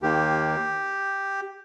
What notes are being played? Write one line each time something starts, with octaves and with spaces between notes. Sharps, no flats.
D#2 D#3 A#3 G4